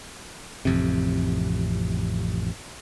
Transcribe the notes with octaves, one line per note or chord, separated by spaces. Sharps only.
A1 F2 C3